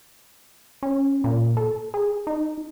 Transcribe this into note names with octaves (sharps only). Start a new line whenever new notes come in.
C#4
A#2
A4
G#4
D#4